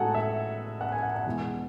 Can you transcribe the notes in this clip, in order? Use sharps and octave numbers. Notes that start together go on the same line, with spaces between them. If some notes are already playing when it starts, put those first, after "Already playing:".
Already playing: A2 G#3 D#4 F#4 A4 F#5 G#5
E5
F#5
G#5
F#5
F#5
E2 B2 G#3